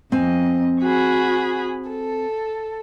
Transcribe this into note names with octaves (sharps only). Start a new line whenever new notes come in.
F2 C4 D#5 G#5
F#4 G#4 B5
A4